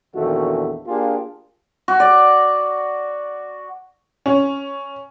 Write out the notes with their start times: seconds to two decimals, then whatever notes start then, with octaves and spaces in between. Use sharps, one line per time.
0.15 A#1 E2 D#3 A3 F#4
0.87 A#3 D4 F4 G4 G#4
1.88 F#4
2.00 D5
4.26 C#4